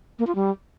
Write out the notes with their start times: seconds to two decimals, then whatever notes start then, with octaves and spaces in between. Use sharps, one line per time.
0.19 A#3
0.27 F4
0.35 G3